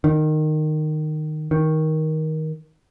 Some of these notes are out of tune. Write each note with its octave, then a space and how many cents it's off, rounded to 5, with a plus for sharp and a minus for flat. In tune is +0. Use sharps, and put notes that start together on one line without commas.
D#3 -15
D#3 +15